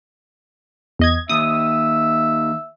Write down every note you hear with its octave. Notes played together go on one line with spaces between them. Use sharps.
E2 D#5 G#6
D#2 E5 D#6